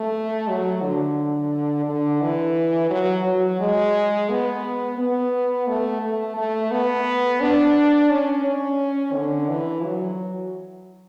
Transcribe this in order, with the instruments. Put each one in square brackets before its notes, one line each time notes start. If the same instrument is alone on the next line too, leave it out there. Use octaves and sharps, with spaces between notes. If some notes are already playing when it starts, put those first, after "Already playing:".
Already playing: [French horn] A3
F#3
D3
D3
E3
F#3
F#3
G#3
B3
B3
A3
A3
A3
B3
D4
C#4
C#4
D3
E3
F#3